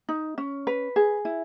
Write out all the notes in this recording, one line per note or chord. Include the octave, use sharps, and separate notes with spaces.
D#4
C#4
B4
G#4
E4